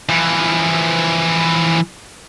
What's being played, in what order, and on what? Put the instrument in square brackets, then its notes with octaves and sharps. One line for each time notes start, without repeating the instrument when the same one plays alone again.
[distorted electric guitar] E3 F3